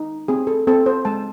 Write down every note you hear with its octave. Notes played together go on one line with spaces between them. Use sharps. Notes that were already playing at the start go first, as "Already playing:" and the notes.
Already playing: D#4
C4 G#4
A4
C4 A4
C5
G#3 A5